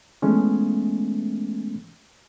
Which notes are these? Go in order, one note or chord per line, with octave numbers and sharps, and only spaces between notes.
E3 G#3 A3 B3 C#4